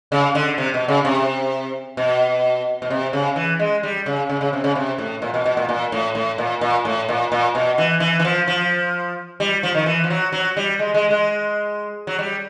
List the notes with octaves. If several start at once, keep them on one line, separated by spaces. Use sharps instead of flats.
C#3
D3
C3
B2
C#3
C3
B2
B2
C3
C#3
E3
G#3
G3
C#3
C#3
C#3
C3
C#3
C3
A2
A#2
B2
B2
A#2
A#2
A2
A2
A#2
A#2
A2
A#2
A#2
B2
E3
E3
E3
F3
F3
G3
F3
D#3
E3
F3
F#3
F#3
G3
G#3
G#3
G#3
F#3
G3